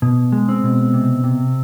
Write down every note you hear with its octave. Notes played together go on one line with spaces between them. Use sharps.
B2
G#3
C4
B2
C3
C3